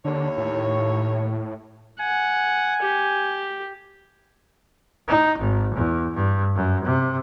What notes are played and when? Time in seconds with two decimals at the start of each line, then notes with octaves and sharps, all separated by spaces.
0.05 D#2 D3 C#5
0.38 A2
2.00 F#5 G#5
2.82 G4
5.08 D#4
5.39 G#1
5.75 E2
6.14 G2
6.56 F#2
6.85 C3